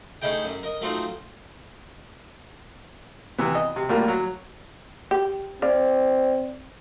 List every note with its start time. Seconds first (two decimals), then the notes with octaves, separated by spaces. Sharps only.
0.22 A3 C#4 D#4 E4 G#4 G5
0.45 F#2
0.63 A#4 D#5
0.81 F#3 A3 C4 D#4 F4
3.38 C3 E3 B3
3.55 D#5
3.76 C3
3.89 A2 G3 A#3 F4
4.08 F#3
5.11 G4
5.62 C4 D5 F5